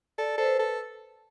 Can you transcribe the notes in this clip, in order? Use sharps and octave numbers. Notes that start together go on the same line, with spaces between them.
A4 D5
A4 C5
B4
A4